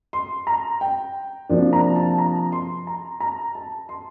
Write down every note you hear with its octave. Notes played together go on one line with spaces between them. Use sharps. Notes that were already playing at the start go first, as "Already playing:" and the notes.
C6
A#5
G5
C3 F3 A#3 D4
A#5
A5
A#5
C6
A#5
A#5
A5
C6